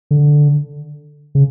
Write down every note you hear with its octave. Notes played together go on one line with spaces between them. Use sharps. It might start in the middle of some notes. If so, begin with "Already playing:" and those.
D3
C#3